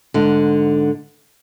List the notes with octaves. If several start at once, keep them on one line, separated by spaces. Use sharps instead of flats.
G#2 D3